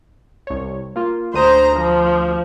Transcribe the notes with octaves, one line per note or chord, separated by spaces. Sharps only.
C2 C#5
A#3 F4
D2 C5 A#5 D#6
F3